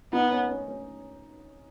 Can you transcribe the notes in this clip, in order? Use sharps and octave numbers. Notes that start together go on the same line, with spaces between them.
B3 D#4
C#4
C#4
C#4